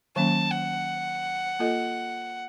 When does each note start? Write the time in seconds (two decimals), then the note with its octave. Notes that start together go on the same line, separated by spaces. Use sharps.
0.16 D#3 F#3 A#3 C#4 A5
0.52 F#5
1.59 A#3 F4 A4 D#5